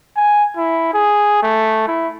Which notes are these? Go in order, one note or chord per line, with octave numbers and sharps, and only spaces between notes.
G#5
E4
G#4
A3
E4